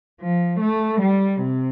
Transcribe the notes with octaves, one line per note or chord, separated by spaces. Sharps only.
F3
A3
G3
C3